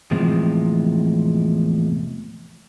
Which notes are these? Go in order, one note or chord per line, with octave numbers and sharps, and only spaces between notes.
E2 A2 C3 F3 G#3